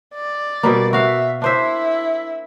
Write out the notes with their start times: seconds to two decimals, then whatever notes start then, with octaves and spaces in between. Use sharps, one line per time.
0.14 D5
0.63 B2 G3 A#3
0.93 F#4 E5 F5
1.42 D4 E4 C5 E5